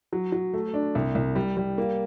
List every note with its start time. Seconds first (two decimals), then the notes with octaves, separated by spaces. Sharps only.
0.13 F#3
0.32 F#3
0.54 A3
0.74 D4
0.95 C2
1.15 C2
1.36 G3
1.57 G3
1.78 A#3